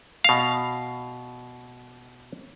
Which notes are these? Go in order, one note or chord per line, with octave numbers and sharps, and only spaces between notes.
B2 F5